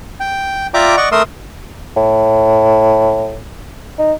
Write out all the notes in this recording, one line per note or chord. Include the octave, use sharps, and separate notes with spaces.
G5
F4 D5 E5 G5 A#5 D6
D5 D#5 F#5 C#6
A3 A#4 C6 D#6 E6
A2
D#4